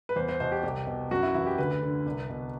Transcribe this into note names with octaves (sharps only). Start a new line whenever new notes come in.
B4
E2 C5
C5
B2 C5
G4
C2 G4
B2
F#2 F#4
E4
E3 E4
G4
D2 B4
D3
C2
B2